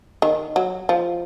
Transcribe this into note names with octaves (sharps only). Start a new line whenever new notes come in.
D#3
F#3
F3